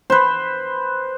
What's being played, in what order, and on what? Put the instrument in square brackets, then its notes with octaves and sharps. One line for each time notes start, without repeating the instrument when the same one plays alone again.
[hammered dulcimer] B4 C5